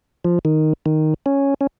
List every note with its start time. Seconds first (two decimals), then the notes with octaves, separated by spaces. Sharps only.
0.25 F3
0.45 D#3
0.86 D#3
1.26 C#4
1.61 C#4